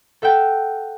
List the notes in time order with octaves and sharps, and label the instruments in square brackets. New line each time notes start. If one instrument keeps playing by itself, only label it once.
[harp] A4 E5 F#5 G5 A5